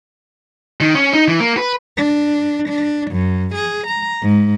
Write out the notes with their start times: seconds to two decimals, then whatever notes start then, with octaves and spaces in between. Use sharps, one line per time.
0.81 D#3
0.95 C#4
1.14 D#4
1.28 E3
1.40 A#3
1.57 B4
1.98 D4
2.68 D4
3.10 F#2
3.53 G#4
3.86 A#5
4.21 G#2